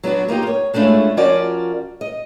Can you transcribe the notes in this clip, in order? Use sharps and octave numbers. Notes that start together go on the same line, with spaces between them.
F#3 B3 D4 F#4
A#3 D#4 F4 G4
A#4 C#5
G#3 A3 C#4 D4 E4 F4
F3 C#4 F4 F#4 A#4 D5
D#5